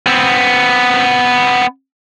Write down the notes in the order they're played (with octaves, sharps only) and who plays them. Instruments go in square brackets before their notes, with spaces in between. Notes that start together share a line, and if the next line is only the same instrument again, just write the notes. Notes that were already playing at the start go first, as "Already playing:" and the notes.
[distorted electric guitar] B3 C4